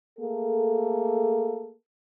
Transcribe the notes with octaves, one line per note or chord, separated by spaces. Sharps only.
A3 A#3 G#4 A4